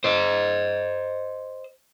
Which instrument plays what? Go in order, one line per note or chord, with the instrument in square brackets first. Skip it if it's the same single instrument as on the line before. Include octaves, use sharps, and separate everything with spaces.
[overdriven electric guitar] C5 D#5